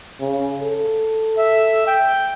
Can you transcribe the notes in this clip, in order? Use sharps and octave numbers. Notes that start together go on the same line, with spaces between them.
C#3
A4
E5
G5